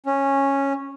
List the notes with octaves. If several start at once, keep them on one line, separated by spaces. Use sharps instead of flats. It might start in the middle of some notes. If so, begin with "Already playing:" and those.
C#4